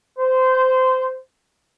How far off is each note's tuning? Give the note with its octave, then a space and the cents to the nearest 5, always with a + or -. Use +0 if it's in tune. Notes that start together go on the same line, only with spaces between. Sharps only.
C5 -20